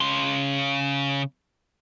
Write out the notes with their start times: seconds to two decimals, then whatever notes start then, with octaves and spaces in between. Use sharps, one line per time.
0.01 C#3 C6